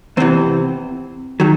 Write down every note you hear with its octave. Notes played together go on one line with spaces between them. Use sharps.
E2 C3 E3 C4
D#3 F#3